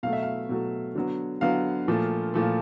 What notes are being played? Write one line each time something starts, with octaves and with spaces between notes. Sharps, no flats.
B2 F#3 A3 F5
E5
F5
B2 F#3 A3
D3 F#3 B3
D3 F#3 B3 F5
A#2 F3 A3
A#2 F3 A3